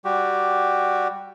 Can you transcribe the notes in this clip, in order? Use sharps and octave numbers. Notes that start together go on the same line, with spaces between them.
G3 F#4 G4